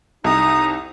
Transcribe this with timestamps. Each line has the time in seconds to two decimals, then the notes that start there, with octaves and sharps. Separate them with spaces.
0.24 C2 F2 D#4 A#5 D#6